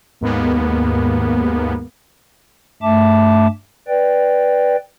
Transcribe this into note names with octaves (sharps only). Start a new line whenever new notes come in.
D#2 G#2 A#3 B3
G2 A3 E5 A5 D6
B4 D5 G5